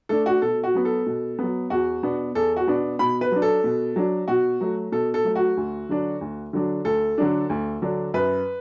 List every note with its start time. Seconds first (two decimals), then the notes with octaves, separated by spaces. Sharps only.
0.09 A3 D4 A4
0.26 F#4
0.42 B2 A4
0.63 F#4
0.74 F#3 B3
0.85 A4
1.06 B2
1.39 F#3 B3
1.70 E2 F#4
2.03 B2 B3 D4
2.35 E2 A4
2.56 F#4
2.67 B2 B3 D4
2.99 B2 B5
3.21 B4
3.31 F#3 D4
3.42 A4
3.64 B2
3.96 F#3 D4
4.28 B2 F#4
4.61 F#3 A3
4.92 B2 A4
5.14 A4
5.24 F#3 A3
5.35 F#4
5.57 D2
5.89 D3 F#3 D4
6.21 D2
6.53 D3 F#3 D4
6.85 D2 A4
7.18 D3 F#3 D4
7.50 D2
7.82 D3 F#3 D4
8.14 F#2 B4